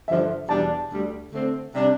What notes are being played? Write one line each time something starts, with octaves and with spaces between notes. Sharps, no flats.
G2 D3 F3 E5
E2 B2 G3 D4 A5
D2 D3 G3
D3 A3 C4
C3 G3 D4